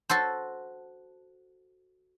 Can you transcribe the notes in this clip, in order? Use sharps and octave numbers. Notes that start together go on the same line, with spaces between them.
F#4 A4 C5